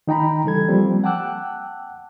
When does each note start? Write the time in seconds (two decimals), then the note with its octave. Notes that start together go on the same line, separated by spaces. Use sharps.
0.07 D#3 D#4 G5 A#5 B5
0.44 C#3 E3 G3 A4 G#6
0.68 F3 G3 A#3 C4
1.04 F#5 G5 A5 D6 E6 F#6